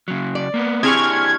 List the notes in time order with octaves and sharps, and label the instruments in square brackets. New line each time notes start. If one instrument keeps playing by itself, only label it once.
[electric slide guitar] C#3 F#3
[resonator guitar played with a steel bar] D5
[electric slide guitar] A#3 B3
[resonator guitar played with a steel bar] C4 G#4 [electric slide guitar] D4 E4 G4 [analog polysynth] C#6 F6 G#6